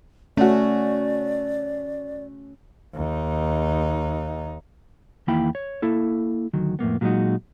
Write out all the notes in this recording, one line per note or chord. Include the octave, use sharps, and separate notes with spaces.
A3 C#4 F#4 D5
D#2 D#4
E2 D#3 A#3 E4 G5 B5
C#5
A#3 E4 A4
D2 D#3 F#3
F2 A2 A#3 B3
A#2 F#3 G#3 C#4 D#4 F#4